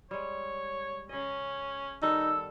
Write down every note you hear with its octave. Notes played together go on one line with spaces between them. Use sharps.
G3 G#3 C#5
C#3 C#4 D#5
D#3 G3 B3 D#4 A4 E6